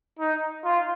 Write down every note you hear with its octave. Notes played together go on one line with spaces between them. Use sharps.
D#4
F4